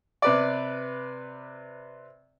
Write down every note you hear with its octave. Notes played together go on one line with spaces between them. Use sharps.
C3 B4 D5